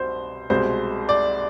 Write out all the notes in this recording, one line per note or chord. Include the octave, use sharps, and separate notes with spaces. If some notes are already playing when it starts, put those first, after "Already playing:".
Already playing: C2 B2 C5
C2 B2 G#3 C5
D5